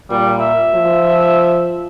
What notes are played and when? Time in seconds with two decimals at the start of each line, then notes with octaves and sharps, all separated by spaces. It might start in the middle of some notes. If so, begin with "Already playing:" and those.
0.11 A#2 G3
0.40 E5
0.75 F3